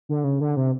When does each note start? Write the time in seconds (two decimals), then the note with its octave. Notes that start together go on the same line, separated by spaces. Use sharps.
0.09 D3
0.24 C#3
0.41 D3
0.57 C3